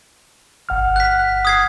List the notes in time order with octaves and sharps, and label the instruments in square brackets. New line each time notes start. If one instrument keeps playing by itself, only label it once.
[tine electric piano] G1 F#5 F6
[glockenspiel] F#6 B6
D#6 G#6 C7